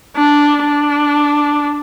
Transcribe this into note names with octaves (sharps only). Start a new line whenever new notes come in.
D4
D4